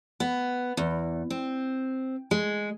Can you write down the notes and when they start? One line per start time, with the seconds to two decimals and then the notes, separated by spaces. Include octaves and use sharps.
0.20 B3
0.77 E2
1.30 C4
2.31 G#3